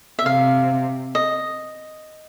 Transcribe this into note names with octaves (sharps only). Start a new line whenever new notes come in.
E5
C3 F5
D#5